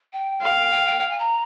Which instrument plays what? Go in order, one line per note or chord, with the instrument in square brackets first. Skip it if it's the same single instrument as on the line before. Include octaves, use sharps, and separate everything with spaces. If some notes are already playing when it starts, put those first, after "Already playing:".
[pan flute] G5
[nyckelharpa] F5
[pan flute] G5
G5
G5
G#5
A#5